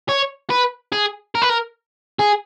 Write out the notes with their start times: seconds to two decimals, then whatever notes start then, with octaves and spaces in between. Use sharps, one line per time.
0.09 C#5
0.50 B4
0.93 G#4
1.35 A#4
1.42 B4
1.50 A#4
2.19 G#4